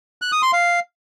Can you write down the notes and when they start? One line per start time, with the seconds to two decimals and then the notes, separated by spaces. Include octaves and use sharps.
0.22 F#6
0.32 D#6
0.43 C6
0.53 F5